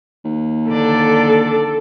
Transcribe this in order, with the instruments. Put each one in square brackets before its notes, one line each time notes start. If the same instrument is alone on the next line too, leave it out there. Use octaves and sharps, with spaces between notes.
[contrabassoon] D#2
[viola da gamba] D3 D5 [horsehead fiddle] A4